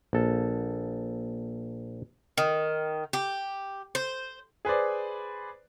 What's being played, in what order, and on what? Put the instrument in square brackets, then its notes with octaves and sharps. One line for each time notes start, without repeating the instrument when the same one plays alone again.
[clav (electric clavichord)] A#1 A4
[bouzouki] D#3
G4
C5
[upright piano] G#4 B4 C5 D5